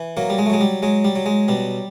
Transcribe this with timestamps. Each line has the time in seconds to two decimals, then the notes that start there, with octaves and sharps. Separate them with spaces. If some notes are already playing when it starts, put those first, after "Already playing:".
Already playing: E3
0.17 F#3 A#3
0.30 G3
0.38 G#3
0.46 A3
0.50 F#3 G#3
0.61 G3
0.82 F#3 G#3
1.04 G3
1.15 F#3
1.26 G#3
1.48 B2 G3